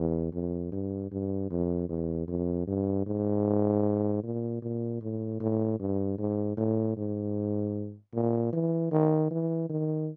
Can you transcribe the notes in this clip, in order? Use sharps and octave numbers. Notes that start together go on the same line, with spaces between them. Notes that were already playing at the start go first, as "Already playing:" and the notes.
Already playing: E2
F2
G2
G2
F2
E2
F2
G2
G#2
A#2
A#2
A2
A2
G2
G#2
A2
G#2
A#2
E3
D#3
E3
D#3